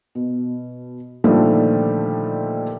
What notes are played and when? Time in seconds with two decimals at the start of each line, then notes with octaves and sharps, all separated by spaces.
0.15 B2
1.24 A#2 D3 D#3 F3 G3 A3